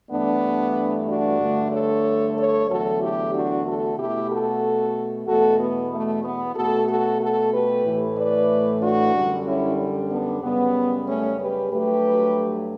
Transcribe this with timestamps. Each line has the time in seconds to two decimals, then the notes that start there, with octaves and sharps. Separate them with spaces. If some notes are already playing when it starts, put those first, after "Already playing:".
0.11 G2 E3 A3 B3 D4
1.08 D4 F#4
1.40 G2 D3 A3
1.72 A4 C#5
2.36 A4 C#5
2.69 E2 D3 F#3 A3 F#4 A4
3.01 E4 G4
3.33 D4 F#4
3.66 F#4 A4
3.97 B2 A3 E4 G4
4.30 F#4 A4
5.26 E2 B2 A3 F#4 A4
5.59 B3
5.91 A3
6.23 B3
6.55 B2 A3 F#4 A4
6.88 F#4 A4
7.20 F#4 A4
7.52 G4 B4
7.84 A2 E3 A3
8.16 B4 D5
8.81 D4 F#4
9.13 F#2 D3 G3
9.46 C#4 E4
10.10 B3 D4
10.42 F#2 C#3 G3 B3
11.07 A3 C#4
11.39 G4 B4
11.71 G2 F#3 A3 G4 B4